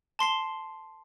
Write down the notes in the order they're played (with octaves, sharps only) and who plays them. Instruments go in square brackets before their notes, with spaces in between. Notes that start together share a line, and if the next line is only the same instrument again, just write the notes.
[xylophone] A5 C6 C7 G7